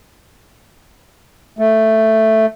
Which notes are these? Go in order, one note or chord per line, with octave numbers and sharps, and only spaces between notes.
A3